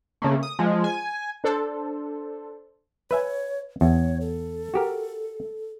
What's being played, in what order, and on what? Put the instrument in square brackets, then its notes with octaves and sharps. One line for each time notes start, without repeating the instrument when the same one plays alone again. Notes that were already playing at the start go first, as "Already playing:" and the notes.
[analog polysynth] C#3 A3 A#3
D#6
F3 G#3
G#5
[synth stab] D4 A4 C5
[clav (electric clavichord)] B4 E5 G#5 [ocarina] C#5
[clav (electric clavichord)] E2 [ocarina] C#5
[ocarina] A4
[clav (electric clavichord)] F#4 G4 A#4